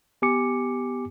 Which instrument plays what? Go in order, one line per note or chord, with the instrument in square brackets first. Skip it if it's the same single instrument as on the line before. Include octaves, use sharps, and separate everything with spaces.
[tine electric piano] B3 G4 G#5 D6 C#7